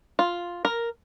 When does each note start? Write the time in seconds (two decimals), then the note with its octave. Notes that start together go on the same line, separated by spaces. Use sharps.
0.19 F4
0.65 A#4